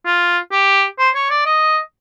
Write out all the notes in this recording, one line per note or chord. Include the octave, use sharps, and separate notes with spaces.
F4
G4
C5
C#5
D5
D#5